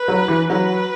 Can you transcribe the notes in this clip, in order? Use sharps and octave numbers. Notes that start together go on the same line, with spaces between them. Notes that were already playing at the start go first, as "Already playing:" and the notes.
Already playing: B4
F#3
E3
F#3 B4